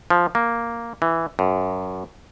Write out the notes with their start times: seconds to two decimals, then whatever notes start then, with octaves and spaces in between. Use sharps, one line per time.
0.10 F3
0.35 A#3
1.02 E3
1.39 F#2